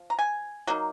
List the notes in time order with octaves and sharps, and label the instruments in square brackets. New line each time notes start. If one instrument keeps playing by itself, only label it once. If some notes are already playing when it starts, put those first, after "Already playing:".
Already playing: [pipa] F3
A#5
G#5
F#3 A#3 D#4